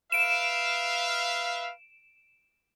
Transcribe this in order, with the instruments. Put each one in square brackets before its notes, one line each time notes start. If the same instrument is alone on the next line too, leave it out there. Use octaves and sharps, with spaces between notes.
[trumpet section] B4 E5 F5 [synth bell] D7 E7